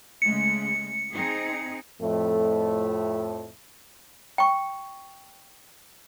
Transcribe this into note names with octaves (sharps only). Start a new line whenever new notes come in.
C#3 G#3 A3 C#7
C4 D#4 G#4
F2 A2 A3
G5 C#6